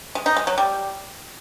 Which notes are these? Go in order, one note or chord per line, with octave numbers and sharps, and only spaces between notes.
G#3
D#4
G#3
F#3
G3